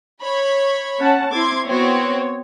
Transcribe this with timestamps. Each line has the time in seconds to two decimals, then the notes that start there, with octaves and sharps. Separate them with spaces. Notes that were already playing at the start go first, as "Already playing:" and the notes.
0.22 C#5 B5
1.00 C#4 F#5 A5
1.32 C4 E4 C6 D6 G#6
1.67 B3 C4 F#4 C#5